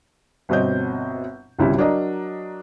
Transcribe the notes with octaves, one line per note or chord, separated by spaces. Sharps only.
G1 B2 C4 D#5 G6
G#1 C#2 C#3 G3 E4
F#3 D4 A#4 D#5 A#5